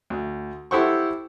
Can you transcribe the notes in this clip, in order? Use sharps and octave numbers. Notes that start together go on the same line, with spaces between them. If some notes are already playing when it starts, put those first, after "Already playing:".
D2
E4 G4 A4 C5 F#5 C#6